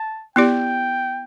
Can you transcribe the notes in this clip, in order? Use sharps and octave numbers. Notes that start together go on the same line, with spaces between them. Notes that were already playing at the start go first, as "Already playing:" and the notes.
Already playing: A5
B3 E4 G4 D5 G5